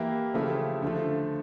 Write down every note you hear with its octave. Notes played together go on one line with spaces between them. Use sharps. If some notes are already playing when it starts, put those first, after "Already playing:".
Already playing: E3 A#3 E4 G4
C#3 F3 A3 E4 G4
D3 F3 A3